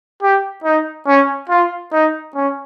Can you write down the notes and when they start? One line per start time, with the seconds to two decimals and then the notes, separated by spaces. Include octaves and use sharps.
0.22 G4
0.64 D#4
1.07 C#4
1.49 F4
1.92 D#4
2.35 C#4